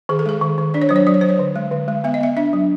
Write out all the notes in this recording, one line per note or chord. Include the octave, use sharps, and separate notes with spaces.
D#3 G#4
A4
G#3 G#4
D#3
D#3
D4 D5
C#5
F#3 C5
C#5
F#3 D5
C#5
F#3 C5
C#5
D3
G#3
D3
G#3
B3 E5
D#5
B3 E5
D4 E5
F#3